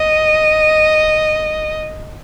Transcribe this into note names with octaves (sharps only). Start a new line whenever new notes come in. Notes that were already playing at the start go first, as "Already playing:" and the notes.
Already playing: D#5